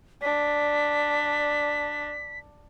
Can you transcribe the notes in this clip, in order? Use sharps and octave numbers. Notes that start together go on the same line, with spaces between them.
D4 B6